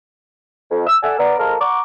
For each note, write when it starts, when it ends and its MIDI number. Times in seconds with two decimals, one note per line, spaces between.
0.71 0.84 41
0.87 0.97 88
1.03 1.16 69
1.03 1.16 74
1.03 1.16 78
1.03 1.16 80
1.03 1.16 88
1.19 1.37 59
1.19 1.37 70
1.19 1.37 74
1.39 1.55 53
1.39 1.55 56
1.39 1.55 58
1.39 1.55 69
1.39 1.55 70
1.60 1.81 78
1.60 1.81 82
1.60 1.81 85
1.60 1.81 86